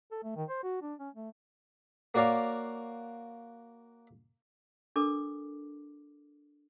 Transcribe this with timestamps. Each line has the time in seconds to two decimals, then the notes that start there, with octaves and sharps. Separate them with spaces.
0.11 A4
0.23 A3
0.36 D#3
0.49 C5
0.63 F#4
0.82 D4
0.99 C#4
1.14 A3
2.15 A#3 F#4 C#5 D5 F5 A#5
4.96 D4 A4 A#4 D6